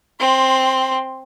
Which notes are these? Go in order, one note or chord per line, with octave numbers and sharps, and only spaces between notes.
C4 C6